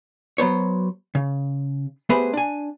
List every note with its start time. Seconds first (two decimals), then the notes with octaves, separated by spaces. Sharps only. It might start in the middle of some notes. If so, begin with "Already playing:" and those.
0.38 F#3 B3 C5 C#5
1.15 C#3
2.09 A3 B3 G4 G#4 B4 C5
2.33 D4 G#5